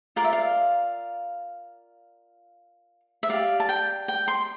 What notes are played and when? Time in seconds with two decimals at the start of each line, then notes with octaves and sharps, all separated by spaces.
0.16 F4 A#4 D5 F5
0.25 E5
0.33 F5
3.23 E5
3.29 G4 D5 F5
3.60 A5
3.69 G5
4.08 G5
4.28 C6